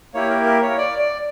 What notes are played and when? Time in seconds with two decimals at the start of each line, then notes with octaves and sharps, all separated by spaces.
0.14 A#3 E4 G4 C#5
0.30 A#4
0.46 A#4
0.62 C#5
0.78 D5
0.99 D5